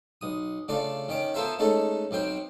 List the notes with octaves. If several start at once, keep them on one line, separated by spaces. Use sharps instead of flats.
B1 D#6
C#3 A3 D4 F4 D5
D#3 C#4 D6
B3 F4 A4 A#4 C5 E5
G#3 A3 C#4 D#4 A4
B1 F#3 C4 G5